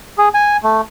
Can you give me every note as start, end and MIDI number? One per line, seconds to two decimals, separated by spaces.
0.18 0.28 68
0.34 0.57 80
0.64 0.81 57